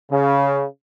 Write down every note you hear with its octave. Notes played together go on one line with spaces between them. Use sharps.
C#3